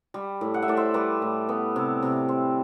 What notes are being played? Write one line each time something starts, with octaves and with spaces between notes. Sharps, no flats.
G3
A2
F#5
E5
A2 D5
C5 E5
G3 B4 D5
A2
B3
C3
C3
C4